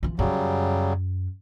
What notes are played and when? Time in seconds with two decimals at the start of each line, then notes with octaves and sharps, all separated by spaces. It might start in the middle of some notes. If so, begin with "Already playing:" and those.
0.03 E3 F4
0.19 F#2 C#3 F#3 G3 C#4